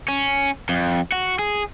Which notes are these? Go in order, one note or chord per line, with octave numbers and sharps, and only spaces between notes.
C#4
F2
F#4
G#4